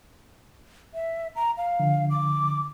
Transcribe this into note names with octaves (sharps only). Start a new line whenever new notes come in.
E5
A#5
F5
D3 F3
D6